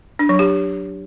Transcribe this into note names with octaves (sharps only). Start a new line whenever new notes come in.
D4
F#3
G4